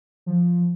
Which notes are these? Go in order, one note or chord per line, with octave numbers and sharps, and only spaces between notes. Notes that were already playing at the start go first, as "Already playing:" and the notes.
F3